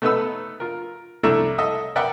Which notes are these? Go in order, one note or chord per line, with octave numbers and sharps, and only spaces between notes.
A3 B3 D#4 A4 B4 E6
F4 A#4
C2 A3 D4 E4 A4 A#5
A4 D#5 E5 D#6
A#4 B4 D5 E5 F#5 G5